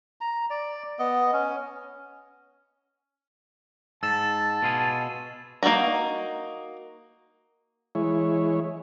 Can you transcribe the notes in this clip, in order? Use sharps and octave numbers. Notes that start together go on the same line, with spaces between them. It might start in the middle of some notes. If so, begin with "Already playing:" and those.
A#5
D5
B3 D#5
C#4
G#2 A5 E6 A6 E7
B2 F4 G#4
A#3 D#4 F4 F#4 A#5
E3 G#3 E4 C#5